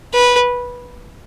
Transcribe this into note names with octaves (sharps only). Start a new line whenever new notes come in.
B4